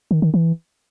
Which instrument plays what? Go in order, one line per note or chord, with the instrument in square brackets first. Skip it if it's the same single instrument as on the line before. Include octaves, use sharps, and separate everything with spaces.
[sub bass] D#3
D#3
E3